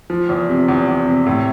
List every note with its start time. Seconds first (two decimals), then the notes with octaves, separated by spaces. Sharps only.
0.10 F3
0.29 E2
0.49 C3
0.68 E2
0.88 E2
1.07 C3
1.27 A2